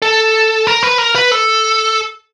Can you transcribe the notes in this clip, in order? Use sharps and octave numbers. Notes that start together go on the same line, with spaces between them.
A4
A#4
B4
A#4
B4
A4